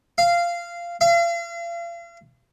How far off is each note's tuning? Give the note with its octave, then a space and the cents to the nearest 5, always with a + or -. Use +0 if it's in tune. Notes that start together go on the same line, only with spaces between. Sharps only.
F5 -15
F5 -40